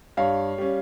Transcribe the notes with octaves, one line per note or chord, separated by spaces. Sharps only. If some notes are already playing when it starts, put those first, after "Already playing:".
G2 C#5 F5
G3 C#4